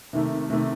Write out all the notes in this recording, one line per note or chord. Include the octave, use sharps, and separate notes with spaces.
C3 D#3 A3
C3 D#3 A3